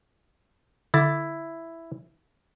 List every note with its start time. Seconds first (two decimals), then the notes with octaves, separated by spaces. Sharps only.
0.94 D3 E4 D6 A6